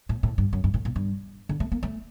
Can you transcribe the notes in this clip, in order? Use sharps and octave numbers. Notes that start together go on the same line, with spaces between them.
A2
A2
G2
F#2
G2
A2
A#2
G2
D3
A3
A#3
A3